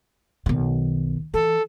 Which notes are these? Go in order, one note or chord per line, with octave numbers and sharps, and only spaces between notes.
B1 D#3
E3 A4